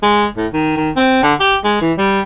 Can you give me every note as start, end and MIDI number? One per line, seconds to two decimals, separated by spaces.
0.03 0.26 56
0.37 0.47 45
0.53 0.73 51
0.77 0.90 51
0.96 1.22 60
1.23 1.34 50
1.40 1.56 67
1.64 1.78 56
1.81 1.93 52
1.98 2.20 55